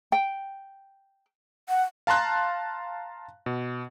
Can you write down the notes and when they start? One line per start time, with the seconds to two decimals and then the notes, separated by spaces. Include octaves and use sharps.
0.12 G5
1.69 F#5
2.07 F5 A5 A#5 C6 F#6
3.46 B2